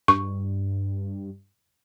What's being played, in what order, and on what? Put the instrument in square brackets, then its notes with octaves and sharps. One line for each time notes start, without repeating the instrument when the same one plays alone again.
[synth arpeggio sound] G2 [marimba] C#6